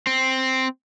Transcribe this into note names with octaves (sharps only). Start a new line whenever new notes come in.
C4